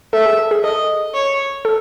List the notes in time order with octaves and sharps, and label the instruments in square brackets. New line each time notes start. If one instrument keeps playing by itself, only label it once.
[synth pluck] A4 [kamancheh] E5
[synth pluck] G#4
A4
G#4
[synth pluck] A4 [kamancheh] D#5
[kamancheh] C#5
[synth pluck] A4